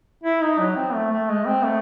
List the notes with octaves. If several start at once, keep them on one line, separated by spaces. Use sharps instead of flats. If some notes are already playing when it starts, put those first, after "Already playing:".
E4
D#4
F#3
C4
A3
A3
G#3
C4
A3